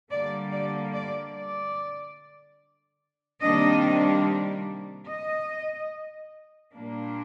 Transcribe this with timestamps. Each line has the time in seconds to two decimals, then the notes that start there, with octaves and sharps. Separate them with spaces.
0.10 D3 G3 A#3 D5
0.52 D5
0.94 D5
1.35 D5
3.41 C3 D#3 G3 A#3 D4 D#5
5.07 D#5
6.73 A#2 G3 A#3 D4